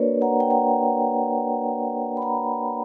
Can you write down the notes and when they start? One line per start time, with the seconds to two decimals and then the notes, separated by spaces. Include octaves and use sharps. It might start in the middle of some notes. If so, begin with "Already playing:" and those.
Already playing: A#3 D4 F#4 A#4 B4 C#5 D5
0.22 F#5 A#5
0.40 G5
0.50 F#5 A#5
2.17 B5
2.22 F#5 A#5